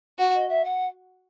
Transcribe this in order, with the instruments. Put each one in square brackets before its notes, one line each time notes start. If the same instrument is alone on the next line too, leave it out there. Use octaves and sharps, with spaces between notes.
[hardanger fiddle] F#4
[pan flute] D#5
E5
F#5